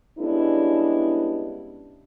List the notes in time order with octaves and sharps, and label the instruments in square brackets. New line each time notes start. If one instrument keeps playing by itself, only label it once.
[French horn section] G3 G#3 B3 C#4 D4 E4